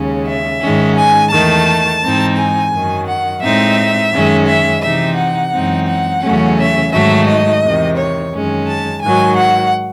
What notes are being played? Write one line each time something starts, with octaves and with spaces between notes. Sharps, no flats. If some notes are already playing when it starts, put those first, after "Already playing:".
Already playing: D#2 C#3 G#3 C#4
E5
G#2 D#3 G#3 C#4
G#5
E2 D#3 A3 A5
G#2 E3 C4 D#4
G#5
F#2 D#3 F#3
F#5
A2 G#3 C4 D#4 E5
F#2 D#3 G#3 C#4
E5
C3 E3 C4 D#4 E5
F#5
F#2 E3 G#3 C4 D#4
F#5
E2 C#3 F#3 A3 C#4
E5
G#2 D#3 F#3 A3 E5
D#5
E2 C3 D#3
C#5
F#2 D#3 G#3 C#4
A5
G#2 D#3 F#3 G#5
F#5